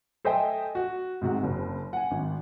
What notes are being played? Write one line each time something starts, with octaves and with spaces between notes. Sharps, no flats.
A4 C5 D#5 E5 G5 G#5
F#4
G#2 C3 F#4
F#1
F#5 G#5
G#1